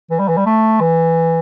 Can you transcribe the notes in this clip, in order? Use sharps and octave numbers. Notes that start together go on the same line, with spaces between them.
E3
G3
E3
G3
A3
E3